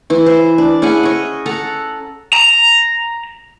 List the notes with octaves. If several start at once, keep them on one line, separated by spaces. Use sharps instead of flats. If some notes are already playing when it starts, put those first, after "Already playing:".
E3 E4
C5
D4
C#4 E4 G#4 F#5
C#5 D#5
A4 F#5 A#5
A#5